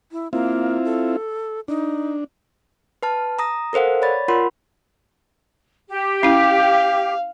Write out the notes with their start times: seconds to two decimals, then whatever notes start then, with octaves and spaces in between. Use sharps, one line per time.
0.12 E4
0.33 A#3 C4 E4 F4
0.85 A4
1.68 D4 D#4
3.03 B4 A5 F6
3.39 A#5 D#6 A#6
3.73 A4 A#4 C5 F5 F#5
4.02 C#5 D5 B5 A6
4.28 F4 A#4 F#5 B5 C6
5.89 G4
6.23 C#4 E4 F5